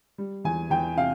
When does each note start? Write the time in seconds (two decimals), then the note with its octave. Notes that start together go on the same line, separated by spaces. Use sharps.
0.18 G3
0.44 E2 G#5
0.70 E2 G5
0.97 C3 F5